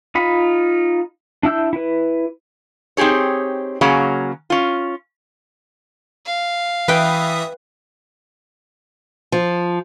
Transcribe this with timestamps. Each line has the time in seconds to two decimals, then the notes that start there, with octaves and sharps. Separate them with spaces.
0.15 D#4 F4 B5
1.43 D4 E4 E6 G6
1.73 E4 B4
2.97 C4 D#4 G4 G#4 C#5
3.81 C#3 F#3 A#3 C#4 G#4
4.50 C#4 F4
6.25 F5
6.88 E3 B4 E5 G5 D#6
9.32 F3